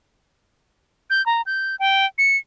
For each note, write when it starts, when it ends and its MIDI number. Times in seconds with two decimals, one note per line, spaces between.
1.10 1.24 91
1.26 1.42 82
1.46 1.76 91
1.79 2.06 79
2.18 2.37 97